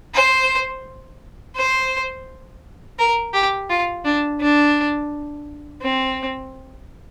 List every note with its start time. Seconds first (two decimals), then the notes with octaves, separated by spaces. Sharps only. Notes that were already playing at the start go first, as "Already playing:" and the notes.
0.14 C5
1.56 C5
2.99 A#4
3.34 G4
3.70 F4
4.05 D4
4.41 D4
5.82 C4